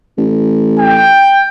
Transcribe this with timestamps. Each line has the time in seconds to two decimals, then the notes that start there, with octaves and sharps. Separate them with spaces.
0.17 A1
0.79 G5